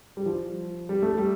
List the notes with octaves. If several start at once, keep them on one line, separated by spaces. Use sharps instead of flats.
G3
F3
G3
A3
G3